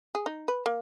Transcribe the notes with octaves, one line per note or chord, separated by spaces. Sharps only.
G#4
D#4
B4
A#3